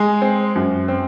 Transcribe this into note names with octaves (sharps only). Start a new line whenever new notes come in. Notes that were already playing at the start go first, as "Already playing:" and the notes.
Already playing: G#3 G#5
C4
F#2
C4